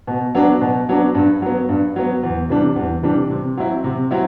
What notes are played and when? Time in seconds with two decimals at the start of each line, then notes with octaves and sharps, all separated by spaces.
0.07 B2
0.35 F#3 B3 D4
0.61 B2
0.89 F#3 B3 D4
1.15 G2
1.42 F#3 B3
1.69 G2
1.96 F#3 B3
2.23 E2
2.49 C3 E3 G3 D4
2.76 E2
3.02 C3 E3 G3 D4
3.30 C3
3.57 F#3 C4 E4
3.84 C3
4.11 F#3 C4 E4